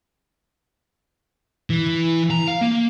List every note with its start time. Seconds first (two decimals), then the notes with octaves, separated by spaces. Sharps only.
1.70 E3
2.31 A#5
2.48 F5
2.61 A#3